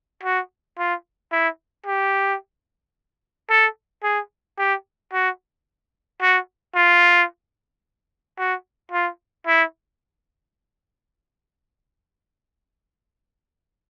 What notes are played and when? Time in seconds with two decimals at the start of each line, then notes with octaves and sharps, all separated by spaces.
0.23 F#4
0.78 F4
1.32 E4
1.86 G4
3.50 A4
4.03 G#4
4.58 G4
5.13 F#4
6.22 F#4
6.75 F4
8.38 F#4
8.92 F4
9.47 E4